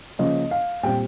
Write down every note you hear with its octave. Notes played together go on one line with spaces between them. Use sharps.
C#3 F3 A#3 C#4 D#5
F5
A#2 G3 C4 G5